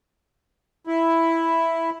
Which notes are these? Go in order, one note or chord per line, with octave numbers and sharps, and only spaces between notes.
E4